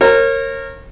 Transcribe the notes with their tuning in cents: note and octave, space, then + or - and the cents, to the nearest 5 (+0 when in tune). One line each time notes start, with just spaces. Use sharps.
A#4 -15 C#5 -35